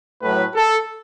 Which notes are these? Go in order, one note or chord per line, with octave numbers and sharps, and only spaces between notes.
A2 F#3 B4
A4